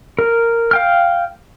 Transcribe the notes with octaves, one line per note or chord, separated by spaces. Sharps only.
A#4
F5 G5 F6